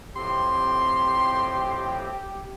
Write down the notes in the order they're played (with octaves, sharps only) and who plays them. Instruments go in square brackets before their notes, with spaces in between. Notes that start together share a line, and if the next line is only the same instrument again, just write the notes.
[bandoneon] F2 A2 C4 [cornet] G4 [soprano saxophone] C6